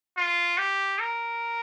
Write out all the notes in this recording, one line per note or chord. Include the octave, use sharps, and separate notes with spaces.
F4
G4
A#4